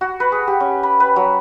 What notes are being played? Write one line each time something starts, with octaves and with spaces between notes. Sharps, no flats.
F#4
B4
G#4
G4
C#4
B5
B4
F#3